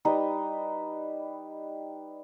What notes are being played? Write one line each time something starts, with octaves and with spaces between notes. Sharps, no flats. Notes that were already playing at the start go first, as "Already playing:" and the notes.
G3 D#4 B4